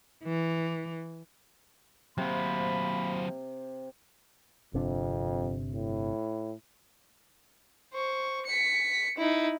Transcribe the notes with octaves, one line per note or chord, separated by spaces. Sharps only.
E3
C3 F#3 A#3 C5 B5
G1 F2 C3 D4
A2
C5 C#6
B6 C#7
D#4 E4